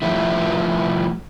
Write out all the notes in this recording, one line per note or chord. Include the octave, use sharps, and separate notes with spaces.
F3 G3 A3 E4